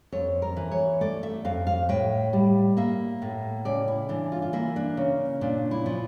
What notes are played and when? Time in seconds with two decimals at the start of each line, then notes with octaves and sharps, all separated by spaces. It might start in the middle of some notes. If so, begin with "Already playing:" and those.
0.12 F2 C#5
0.42 A#4
0.56 E3
0.71 C#5
1.01 A3 D5
1.23 E5
1.45 F2 F5
1.67 F5
1.89 A2 G5
2.33 G3
2.77 A#3 E5
3.22 A2
3.65 C#3 D5
3.88 E4
4.09 E3 D4
4.32 F4
4.42 F4
4.53 A#3 E4
4.76 D4
4.97 C#3
5.41 A#2 D4
5.71 E4
5.86 F3